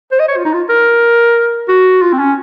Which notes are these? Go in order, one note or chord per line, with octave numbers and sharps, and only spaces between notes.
C5
D#5
C#5
F4
D#4
F4
A#4
F#4
F4
C4
C#4